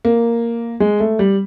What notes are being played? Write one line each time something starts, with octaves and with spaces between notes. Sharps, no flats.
A#3
G#3
A3
G3